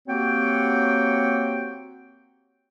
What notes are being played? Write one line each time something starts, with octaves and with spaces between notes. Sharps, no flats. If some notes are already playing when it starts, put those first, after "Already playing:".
A#3 C4 F#4 G4 C#5 G5